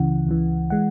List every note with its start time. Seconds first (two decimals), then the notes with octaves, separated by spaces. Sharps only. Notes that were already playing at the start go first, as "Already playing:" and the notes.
Already playing: C#2 C#3 E3 F#5
0.27 C#2 C#3 E3
0.70 E3 G#3 F#5